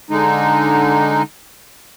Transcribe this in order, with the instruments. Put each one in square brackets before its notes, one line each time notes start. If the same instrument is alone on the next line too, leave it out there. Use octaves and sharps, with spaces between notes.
[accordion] D3 G#3 D#4